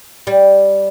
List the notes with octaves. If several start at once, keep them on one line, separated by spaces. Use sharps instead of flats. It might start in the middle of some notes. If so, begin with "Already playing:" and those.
G3